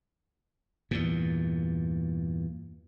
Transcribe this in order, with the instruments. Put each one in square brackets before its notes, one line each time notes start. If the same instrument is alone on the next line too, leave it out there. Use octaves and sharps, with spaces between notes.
[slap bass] E2 G2 A#2